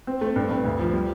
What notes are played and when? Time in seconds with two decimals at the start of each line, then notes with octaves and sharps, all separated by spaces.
0.07 C4
0.21 A3
0.36 G2
0.51 G2
0.65 D2
0.79 F3
0.93 G3